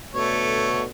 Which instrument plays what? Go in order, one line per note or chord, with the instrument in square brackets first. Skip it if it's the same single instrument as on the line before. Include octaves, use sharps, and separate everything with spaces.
[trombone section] B2 D3 [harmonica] A3 C#5